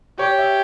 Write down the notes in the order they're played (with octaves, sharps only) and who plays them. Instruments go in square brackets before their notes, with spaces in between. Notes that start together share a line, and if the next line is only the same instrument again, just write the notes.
[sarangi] G4 [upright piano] C#5
[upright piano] E5